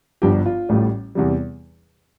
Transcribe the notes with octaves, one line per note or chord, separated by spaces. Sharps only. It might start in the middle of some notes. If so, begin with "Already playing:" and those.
G1 G2 F3 G4
F4
A1 A2 G3
E2 C3 G3